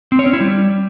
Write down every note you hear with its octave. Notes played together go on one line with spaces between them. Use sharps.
C4
C#5
C#4
E4
G3